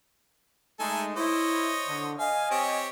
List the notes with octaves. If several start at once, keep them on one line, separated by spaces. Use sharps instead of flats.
G#3 A3 D#4 A4 G#5
E4 C5 C#5 D#5
D3
D#5 F5 G#5
C4 G4 C#5